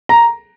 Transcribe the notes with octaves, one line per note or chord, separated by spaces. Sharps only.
A#5